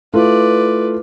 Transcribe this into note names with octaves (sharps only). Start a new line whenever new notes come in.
A3 E4 F4 B4 D5